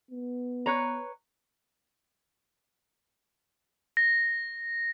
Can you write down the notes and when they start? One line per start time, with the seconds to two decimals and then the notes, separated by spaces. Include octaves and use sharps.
0.11 B3
0.66 B4 C#5 A#5
3.97 A#6